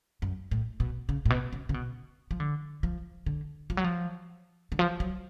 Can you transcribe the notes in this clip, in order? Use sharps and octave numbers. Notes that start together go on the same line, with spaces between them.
F#2
A2
B2
C#3
A2
B2
C#3
C#3
B2
F3
D3
F3
D3
F3
F#3
F3
D3
F3
F#3